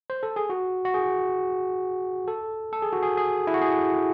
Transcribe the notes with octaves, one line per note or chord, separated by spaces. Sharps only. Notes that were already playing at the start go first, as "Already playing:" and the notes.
C5
A4
G#4
F#4
F#4
G#4
A4
A4
G#4
F#4
G#4
G#4
E4
F#4
G#4